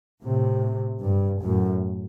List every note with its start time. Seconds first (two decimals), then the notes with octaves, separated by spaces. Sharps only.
0.24 A2 C3
1.03 G2
1.42 F#2 A2